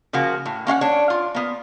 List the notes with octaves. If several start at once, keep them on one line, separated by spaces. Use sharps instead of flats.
C#3 F3 A#3 F#4
A2
A#3 C#4 F5 F#5
D4 C#5
F4
A#3 B3